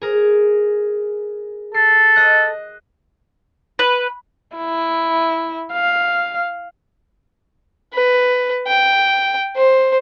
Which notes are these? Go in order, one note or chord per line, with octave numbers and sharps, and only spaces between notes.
G#4 A#4
A4 C7
D#5 F#6
B4
E4
F5
B4
G5
C5